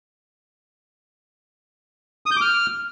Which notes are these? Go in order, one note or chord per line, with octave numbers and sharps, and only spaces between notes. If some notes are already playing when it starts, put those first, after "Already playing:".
D#6
G6
D6
F6